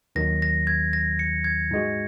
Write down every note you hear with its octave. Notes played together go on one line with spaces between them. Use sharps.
D#2 D#3 F#3 A#6
A#6
G#6
A#6
C#7
G#6
G#2 G#3 F#4